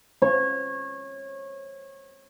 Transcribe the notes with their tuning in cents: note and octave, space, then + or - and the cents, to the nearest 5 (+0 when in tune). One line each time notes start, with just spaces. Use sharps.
C#5 -25